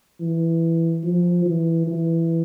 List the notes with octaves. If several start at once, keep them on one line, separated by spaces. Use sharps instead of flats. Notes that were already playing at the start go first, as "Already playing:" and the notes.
E3
F3
E3
E3